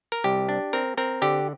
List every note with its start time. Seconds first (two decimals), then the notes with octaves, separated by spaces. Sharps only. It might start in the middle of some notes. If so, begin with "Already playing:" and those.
0.12 A#4
0.24 C2 G4
0.49 D4
0.73 C4 A#4
0.97 C4 A#4
1.22 D3 G4